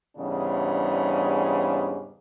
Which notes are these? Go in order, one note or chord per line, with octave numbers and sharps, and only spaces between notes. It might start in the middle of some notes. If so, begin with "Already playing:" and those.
E2 G#2 C#3 G3 D4